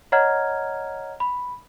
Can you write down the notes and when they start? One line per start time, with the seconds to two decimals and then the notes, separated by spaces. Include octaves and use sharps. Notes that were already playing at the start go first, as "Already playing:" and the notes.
0.12 C#5 D#5 F#5 A#5 F6 G#6
1.20 B5